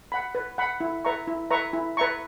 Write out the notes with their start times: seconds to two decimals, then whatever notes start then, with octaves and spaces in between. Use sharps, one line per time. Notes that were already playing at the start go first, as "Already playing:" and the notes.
0.12 F#5 B5
0.35 B4
0.58 F#5 B5
0.80 E4
1.05 B4 E5 A#5 C#6
1.28 E4
1.51 B4 E5 A#5 C#6
1.73 E4
1.97 B4 E5 A#5 C#6